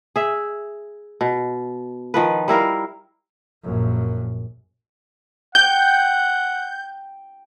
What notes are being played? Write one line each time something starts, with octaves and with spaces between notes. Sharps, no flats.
G#4 E5
B2
D#3 F3 B4
G3 E4 A#4 F5
A#1 F#2
F#5 G5 G6